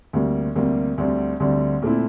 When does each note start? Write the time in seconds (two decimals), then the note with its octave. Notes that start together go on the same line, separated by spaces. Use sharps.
0.13 D2 C3 G3 A#3
0.56 D2 C3 G3 A#3
0.98 D2 D3 G3 C4
1.40 D2 D3 G3 C4
1.82 A#2 A3 C4 E4